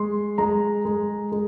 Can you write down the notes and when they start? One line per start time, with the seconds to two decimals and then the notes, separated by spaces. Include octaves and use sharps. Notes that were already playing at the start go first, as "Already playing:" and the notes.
Already playing: G#3 C6
0.38 G#3 A#5
0.85 G#3
1.32 G#3